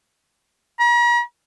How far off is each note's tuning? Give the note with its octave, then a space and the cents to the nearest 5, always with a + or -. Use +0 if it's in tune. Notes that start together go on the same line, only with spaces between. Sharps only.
A#5 +45